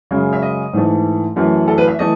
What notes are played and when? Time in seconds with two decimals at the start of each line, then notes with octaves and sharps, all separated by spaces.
0.11 F#2 C#3 G#3
0.33 E5
0.42 D#5
0.73 G#2 E3 A3
1.36 F#2 E3 A3
1.68 A4
1.78 B4
1.88 E5
1.99 E3 A3 D#5